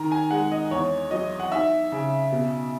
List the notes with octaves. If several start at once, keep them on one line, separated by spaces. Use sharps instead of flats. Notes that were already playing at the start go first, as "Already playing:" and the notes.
Already playing: D#3 A#5
G#5
G#3 F#5
D#5
E2 C#5
F#3 D#5
F#5
D#4 E5
C#3
B2